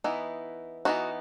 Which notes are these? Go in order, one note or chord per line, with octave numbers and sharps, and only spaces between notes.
E3 B3 D#4 E4
E3 B3 D#4 F#4